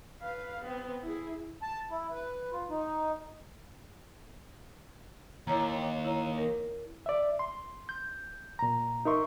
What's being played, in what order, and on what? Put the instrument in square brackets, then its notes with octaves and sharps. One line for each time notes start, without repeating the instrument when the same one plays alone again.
[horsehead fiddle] B4 F5
B3 C4
E4 G#4
[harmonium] A5
E4
B4
F4
D#4
[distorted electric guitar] D#2 [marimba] E4 C#5 A#5
[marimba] E4 C#5 A#5
A#4
[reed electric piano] D5 E5
C6
G6
A#2 A#5
D#4 A#4 E5 C6 C#6